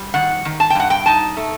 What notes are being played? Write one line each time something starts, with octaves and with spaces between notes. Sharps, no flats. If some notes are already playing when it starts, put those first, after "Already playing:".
Already playing: G3
D#3 F#5
D#3
A5
G5
G2 F#5
G5
D#4 A5
A3